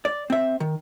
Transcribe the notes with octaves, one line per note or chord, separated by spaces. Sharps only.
D5
C4 E5
D#3